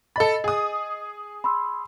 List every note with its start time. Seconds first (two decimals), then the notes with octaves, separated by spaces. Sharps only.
0.16 A4 D#5 B5 A6
0.44 G#4 D#6
1.44 B5 C6 E6